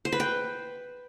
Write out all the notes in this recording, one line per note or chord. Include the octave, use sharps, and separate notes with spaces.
C5
B4
G5